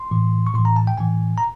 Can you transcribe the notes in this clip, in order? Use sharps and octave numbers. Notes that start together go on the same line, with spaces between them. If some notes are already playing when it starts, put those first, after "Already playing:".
Already playing: C6
A2 E3
C#6
A2 E3 C6
A#5
A5
G5
A2 E3 G#5
A#5